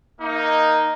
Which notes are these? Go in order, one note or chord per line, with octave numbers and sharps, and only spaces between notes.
A#3 D#4